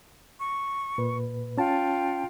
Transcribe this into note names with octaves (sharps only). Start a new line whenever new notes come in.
C#6
A#2 B4
C#4 F4 G5 A5